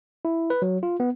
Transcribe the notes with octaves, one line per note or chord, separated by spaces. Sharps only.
E4
B4
F#3
F4
B3